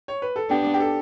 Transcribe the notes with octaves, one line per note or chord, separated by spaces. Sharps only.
C#5
B4
A4
B3 D4 G4
G4
A4